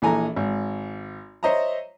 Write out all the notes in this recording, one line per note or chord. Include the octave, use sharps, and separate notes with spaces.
A#1 E3 A4 G#5 A#5
G#1
C5 C#5 D#5 E5 A#5